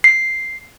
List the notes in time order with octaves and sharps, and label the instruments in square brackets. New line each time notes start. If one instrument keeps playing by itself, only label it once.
[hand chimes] C7